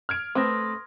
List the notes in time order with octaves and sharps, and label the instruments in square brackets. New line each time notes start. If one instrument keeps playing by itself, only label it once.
[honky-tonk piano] F6 G#6 D7
[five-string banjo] A3 C4 [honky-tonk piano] B4 [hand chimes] C6 D#6 A#6